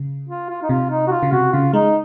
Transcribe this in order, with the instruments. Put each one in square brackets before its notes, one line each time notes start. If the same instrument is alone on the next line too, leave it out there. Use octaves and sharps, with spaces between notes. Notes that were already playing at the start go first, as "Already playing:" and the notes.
Already playing: [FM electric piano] C#3
[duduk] F4
F4
D#4
[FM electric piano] C3 [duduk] F4
[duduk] D#4
F#4
F4
[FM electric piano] C#3
[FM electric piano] C3 [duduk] F#4
[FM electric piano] C#3 [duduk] F4
[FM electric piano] G#3 [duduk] D#4